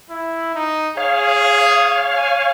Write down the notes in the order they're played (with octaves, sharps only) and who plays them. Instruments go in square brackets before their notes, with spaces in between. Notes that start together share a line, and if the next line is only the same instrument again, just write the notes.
[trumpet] E4
D#4
[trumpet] G#4 [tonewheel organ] C#5 F5
[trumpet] G#5